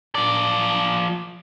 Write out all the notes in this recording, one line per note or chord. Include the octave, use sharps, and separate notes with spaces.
F3 D5